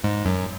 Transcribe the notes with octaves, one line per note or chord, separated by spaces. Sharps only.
G#2
F#2